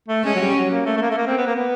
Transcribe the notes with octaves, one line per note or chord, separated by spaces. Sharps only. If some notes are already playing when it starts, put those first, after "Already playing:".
A3
G#3 C#4
F#3
G3
F#3
A#3
A3
A3
A#3
A3
A#3
C4
B3
A#3
B3